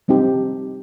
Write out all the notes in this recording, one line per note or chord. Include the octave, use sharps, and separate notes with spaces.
G3 C4 D#4 G4